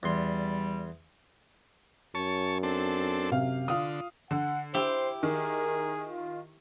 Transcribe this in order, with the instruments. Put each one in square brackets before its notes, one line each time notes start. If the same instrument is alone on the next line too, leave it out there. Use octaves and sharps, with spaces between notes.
[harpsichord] E2 C6 [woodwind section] G3
[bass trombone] F#2 [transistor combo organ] C#5 A5 C#6
[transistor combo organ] C4 D4 A4
[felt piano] C3 F5
[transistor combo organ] D3 [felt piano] F4 F5 D#6
[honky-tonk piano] D3 [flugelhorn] F#5
[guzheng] E4 G4 [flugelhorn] C5
[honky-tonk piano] D#3 [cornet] G#4 [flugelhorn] A#4
[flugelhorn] F4